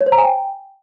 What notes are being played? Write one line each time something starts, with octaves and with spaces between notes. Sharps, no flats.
C#5
C5
A#5
G#5
G5